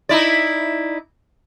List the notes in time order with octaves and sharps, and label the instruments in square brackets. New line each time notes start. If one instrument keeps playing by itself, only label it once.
[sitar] D#4 E4 D5